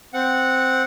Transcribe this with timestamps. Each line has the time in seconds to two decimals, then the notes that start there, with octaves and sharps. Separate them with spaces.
0.14 C4 F#5